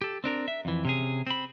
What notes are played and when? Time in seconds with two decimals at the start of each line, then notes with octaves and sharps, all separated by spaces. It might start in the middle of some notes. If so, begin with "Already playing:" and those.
0.02 G4 A4
0.24 C4 D4 A#4
0.48 E5
0.65 F2 E3
0.85 C3 C#4 G#4
1.27 C4 B5